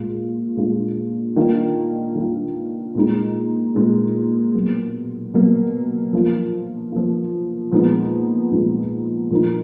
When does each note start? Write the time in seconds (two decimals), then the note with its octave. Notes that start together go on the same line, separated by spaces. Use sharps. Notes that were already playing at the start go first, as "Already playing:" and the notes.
Already playing: A#2 G#3 F4
0.57 A#2 G#3 D4 F4
1.36 D#3 A#3 D4 F4
2.15 D#3 A#3 D4 F4
2.95 A#2 G#3 D#4
3.75 A#2 G#3 D#4
4.54 B2 F#3 A#3
5.34 B2 F#3 A#3
6.13 F3 A#3 F4
6.92 F3 A#3 F4
7.72 A#2 F3 G#3 B3 D#4
8.52 A#2 F3 G#3 B3 D#4
9.31 A#2 F3 A#3 D#4